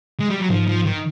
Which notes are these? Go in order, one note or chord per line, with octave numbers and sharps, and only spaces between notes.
G#3
G3
F#3
G#2 F3
F3
D#3